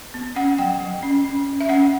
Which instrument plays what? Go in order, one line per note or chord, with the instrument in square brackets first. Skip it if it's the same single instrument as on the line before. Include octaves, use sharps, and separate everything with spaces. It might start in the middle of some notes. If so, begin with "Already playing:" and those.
[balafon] B3
C#4 F#5
F#3 G5
F#3
C#4
C#4
C#4
E5
C#4 F#5